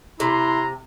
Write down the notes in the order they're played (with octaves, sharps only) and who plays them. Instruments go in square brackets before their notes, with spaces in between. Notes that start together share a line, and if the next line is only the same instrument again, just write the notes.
[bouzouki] C3 [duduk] E4 [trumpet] A#5 [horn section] C6